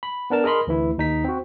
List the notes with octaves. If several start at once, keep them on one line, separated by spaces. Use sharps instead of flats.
B5
B3 D4 A#4 A5
G#4 A#4 D#5 B5 C6
D2 E3 E4
D#2 D#4 B6
C4 F#4